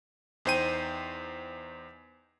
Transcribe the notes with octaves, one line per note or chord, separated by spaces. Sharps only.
E2 D#4 C5 G5 D#7